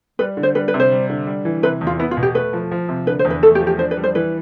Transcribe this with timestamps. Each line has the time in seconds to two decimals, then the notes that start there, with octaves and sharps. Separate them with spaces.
0.19 G3 B4
0.37 D3
0.43 C5
0.55 G3 B4
0.68 B4
0.74 C3
0.80 C5
0.92 G3
1.10 D3
1.27 G3
1.45 E3
1.63 C3 B4
1.81 E2
1.87 F4
1.99 B3 E4
2.11 F4
2.17 B2
2.23 G4
2.35 A3 B4
2.53 F3
2.71 F3
2.89 C3
3.07 D3 B4
3.19 C5
3.25 E2
3.30 B4
3.43 A3 A4
3.55 G4
3.60 F3
3.67 G4
3.79 D4 C5
3.91 B4
3.97 G3
4.03 C5
4.15 E3 B4